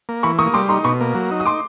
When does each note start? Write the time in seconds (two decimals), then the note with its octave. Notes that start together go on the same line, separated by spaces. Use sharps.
0.09 A#3
0.23 E3 B5 C#6
0.38 A#3 C#6 D#6
0.54 G3 C6 D6
0.69 D#4 A#5 C6
0.84 B2 B5 C#6
1.01 A#3
1.15 F#3
1.31 D#4
1.40 D#6
1.45 C6 D6